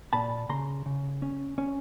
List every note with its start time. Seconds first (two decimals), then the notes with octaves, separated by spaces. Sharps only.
0.13 A#2 A5 B5
0.49 C#3 A#5 C6
0.86 C#3
1.22 C#4
1.58 C#4